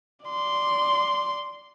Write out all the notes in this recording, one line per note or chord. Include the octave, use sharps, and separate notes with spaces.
D5 C6